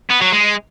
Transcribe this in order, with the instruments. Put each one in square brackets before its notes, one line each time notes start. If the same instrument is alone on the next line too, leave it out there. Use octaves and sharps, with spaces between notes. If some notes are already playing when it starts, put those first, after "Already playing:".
[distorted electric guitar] B3
F#3
G#3